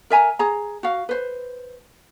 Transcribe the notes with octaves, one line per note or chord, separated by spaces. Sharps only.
A#4 E5 G#5 A#5
G#4 A#5
F#4 F5
B4 C5